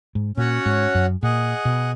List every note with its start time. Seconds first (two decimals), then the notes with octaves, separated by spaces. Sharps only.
0.15 G#2
0.37 A#2 C#4 F#4 C#5 F#5
0.66 G#2
0.95 F#2
1.23 A#2 G#4 D#5 F#5
1.65 B2